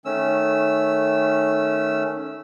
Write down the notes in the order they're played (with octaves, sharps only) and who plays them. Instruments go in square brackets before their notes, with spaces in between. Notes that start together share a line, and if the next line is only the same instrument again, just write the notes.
[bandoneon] D#3 A3 C#4 E6